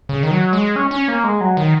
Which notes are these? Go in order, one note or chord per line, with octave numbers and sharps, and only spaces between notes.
C#3
D#3
F#3
G#3
C#4
C#4
A#3
G#3
F#3
D#3